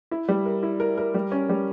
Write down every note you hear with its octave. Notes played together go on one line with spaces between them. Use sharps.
E4
G3
A#4
E4
A#4
A#4
G3
C#4
G3